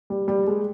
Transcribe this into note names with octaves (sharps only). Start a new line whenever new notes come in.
G3
G3
G#3